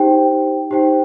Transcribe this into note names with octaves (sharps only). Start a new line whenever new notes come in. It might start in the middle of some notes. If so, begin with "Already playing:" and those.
Already playing: D#4 G4 C5 G5
D#4 G4 C5 G5